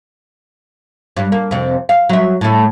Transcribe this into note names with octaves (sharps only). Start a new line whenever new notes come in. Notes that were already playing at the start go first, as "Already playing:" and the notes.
G2
A#3
F2 C3
F5
F#3 E5
A2 A3